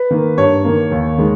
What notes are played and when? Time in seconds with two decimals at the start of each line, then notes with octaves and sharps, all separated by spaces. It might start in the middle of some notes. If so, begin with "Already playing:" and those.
Already playing: B4
0.11 D#3 A#3
0.38 G2 C#5
0.64 D#3 A#3
0.91 D#2
1.18 D#3 G#3